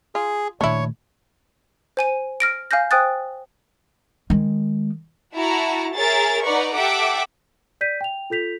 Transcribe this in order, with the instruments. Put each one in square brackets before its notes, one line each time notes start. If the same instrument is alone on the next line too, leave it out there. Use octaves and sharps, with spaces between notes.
[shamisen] F4 [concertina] G#4
[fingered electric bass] A#2 D#3 A3 [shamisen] D4 E4 [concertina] C#5
[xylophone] C5 G#5 D#7
F6 A#6 D7
F5 G#5 F6 G6 A#6
C5 G5 G#5 D#6 F#6 A6
[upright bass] D#3 G#3
[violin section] E4 F#4 A5 A#5
G#4 A#4 C#5 E5 A6
D#4 B4 D5 F#5 A#5 C#6
G4 A4 E5 F#5 D6
[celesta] D5 G6 B6 D#7
G5 F7
F4 A4 G6 B6 F7